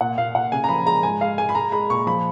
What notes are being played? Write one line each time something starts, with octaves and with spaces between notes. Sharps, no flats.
A#2 F#5
A#2 F5
A#2 F#5
C#3 G#5
A#5
F3 B5
G#3 A#5
G#2 G#5
G#3 F5
G#3 G#5
B5
G#3 A#5
G#3 B5
A#2 C#6
F3 B5